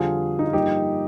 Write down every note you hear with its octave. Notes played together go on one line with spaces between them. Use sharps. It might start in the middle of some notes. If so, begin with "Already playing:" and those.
Already playing: F2 D3 G3 F4 G#4
D#4
F4
G2 F3 A#3 D#4 G4